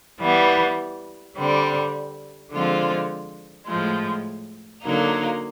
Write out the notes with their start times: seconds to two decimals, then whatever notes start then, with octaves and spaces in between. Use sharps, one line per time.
0.21 E3 G3 B3
1.36 D3 G3 C4
2.52 D3 F3 G#3 C4 F4
3.67 A2 F3 G#3
4.83 D3 F#3 A#3 D#4